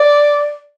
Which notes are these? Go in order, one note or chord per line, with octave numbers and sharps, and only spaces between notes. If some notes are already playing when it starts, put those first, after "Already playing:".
Already playing: D5